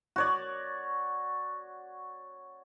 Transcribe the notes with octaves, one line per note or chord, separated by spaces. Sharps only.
F#4 C#5 D5